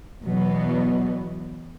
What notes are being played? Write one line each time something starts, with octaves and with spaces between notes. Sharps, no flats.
E2 B2 F#3 B3